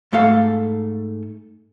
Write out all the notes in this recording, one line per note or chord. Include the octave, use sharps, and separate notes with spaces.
G#2 A3 A4 F5 F#5